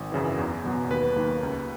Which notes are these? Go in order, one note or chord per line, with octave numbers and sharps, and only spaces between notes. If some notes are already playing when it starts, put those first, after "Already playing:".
Already playing: G#1
F#2 C#3 E3
E2
B2 F#3 B3
D#2 B4
D#3 A#3
C#2